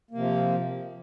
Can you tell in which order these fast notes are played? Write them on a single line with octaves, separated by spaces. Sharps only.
A#3 C3 F3